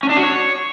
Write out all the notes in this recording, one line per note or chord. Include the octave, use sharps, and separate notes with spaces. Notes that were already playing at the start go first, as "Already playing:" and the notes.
C#4
D4
F#4
C#5